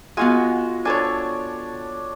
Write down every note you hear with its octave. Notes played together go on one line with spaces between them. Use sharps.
G#3 B3 F4 F#4 G#5
D4 A4 C#5 G#5